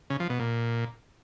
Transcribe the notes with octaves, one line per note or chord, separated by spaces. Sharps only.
C#3
F3
B2
A#2